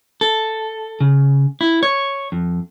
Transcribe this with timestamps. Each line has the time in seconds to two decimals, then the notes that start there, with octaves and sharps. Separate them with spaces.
0.21 A4
1.00 C#3
1.61 E4
1.83 C#5
2.32 F2